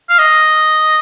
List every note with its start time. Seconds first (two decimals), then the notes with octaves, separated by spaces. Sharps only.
0.09 F5
0.19 D#5